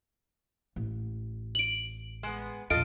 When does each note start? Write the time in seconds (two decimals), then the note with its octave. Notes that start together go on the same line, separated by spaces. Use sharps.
0.76 A1
1.55 D7 F#7
2.23 G#3 B3
2.70 A#1 E2 F4 A4 D#5 D7